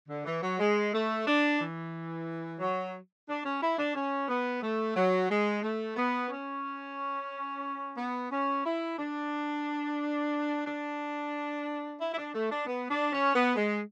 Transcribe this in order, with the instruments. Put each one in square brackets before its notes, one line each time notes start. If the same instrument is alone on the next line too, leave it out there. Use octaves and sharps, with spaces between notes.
[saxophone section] D3
E3
F#3
G#3
A3
D4
E3
F#3
D4
C#4
E4
D4
C#4
B3
A3
F#3
G#3
A3
B3
C#4
B3
C#4
E4
D4
D4
E4
E4
D4
A3
D4
B3
D4
C#4
B3
G#3